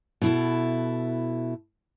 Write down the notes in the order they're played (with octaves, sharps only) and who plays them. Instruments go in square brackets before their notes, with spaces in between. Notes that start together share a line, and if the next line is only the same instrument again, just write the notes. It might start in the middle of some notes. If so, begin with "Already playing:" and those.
[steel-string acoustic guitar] B2 E4 A4